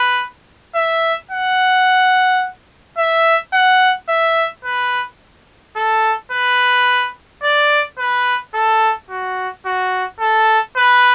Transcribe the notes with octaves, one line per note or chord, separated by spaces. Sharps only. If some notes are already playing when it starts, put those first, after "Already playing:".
Already playing: B4
E5
F#5
E5
F#5
E5
B4
A4
B4
D5
B4
A4
F#4
F#4
A4
B4